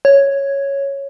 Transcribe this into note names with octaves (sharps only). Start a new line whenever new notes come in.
C#5